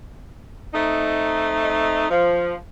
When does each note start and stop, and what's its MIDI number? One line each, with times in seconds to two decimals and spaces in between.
0.74 2.06 57
0.74 2.06 60
0.74 2.06 63
2.10 2.56 53